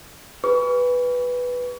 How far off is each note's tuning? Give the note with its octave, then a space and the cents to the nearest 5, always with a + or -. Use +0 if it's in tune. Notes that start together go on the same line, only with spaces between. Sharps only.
G#4 -45 B4 +0 C#6 +35